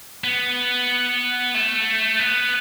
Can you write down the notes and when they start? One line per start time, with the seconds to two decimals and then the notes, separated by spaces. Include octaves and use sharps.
0.24 B3
1.54 A3
2.19 B3